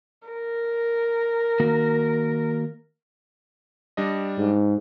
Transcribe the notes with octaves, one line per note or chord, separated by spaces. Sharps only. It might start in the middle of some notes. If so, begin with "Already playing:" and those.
A#4
D#3 A#3 F#4
G3 D4 D#5
G#2